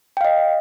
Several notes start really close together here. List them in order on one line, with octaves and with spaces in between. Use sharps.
G5 F5 D#5